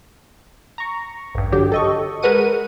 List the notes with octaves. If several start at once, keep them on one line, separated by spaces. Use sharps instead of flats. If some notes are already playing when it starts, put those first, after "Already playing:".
A#5 C#6
A1 G2
D3 F#3 G4
A4 D#5 C#6
G#3 A#4 B4 F#5 D#7